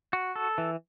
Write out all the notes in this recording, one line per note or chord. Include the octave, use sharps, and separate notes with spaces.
F#4
A4
E3